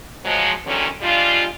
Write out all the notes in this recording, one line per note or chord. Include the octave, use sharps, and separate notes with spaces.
F3 F#3 G#3
E2 A#2 D3 D#3 F#3 C#4
G3 G#3 D4 F4